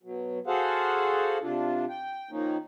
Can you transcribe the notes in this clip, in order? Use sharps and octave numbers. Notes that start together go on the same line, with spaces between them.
B2 F#3
F#4 G#4 A4 C5 F5 F#5
C3 D4 F4
G5
D#3 F3 A#3 C#4 D#4